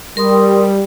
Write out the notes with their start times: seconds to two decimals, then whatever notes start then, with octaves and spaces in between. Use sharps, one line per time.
0.17 G3 A#4 C6 D#6